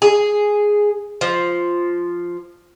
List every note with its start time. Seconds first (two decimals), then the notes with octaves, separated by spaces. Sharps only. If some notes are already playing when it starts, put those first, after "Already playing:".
0.02 G#4
1.21 F3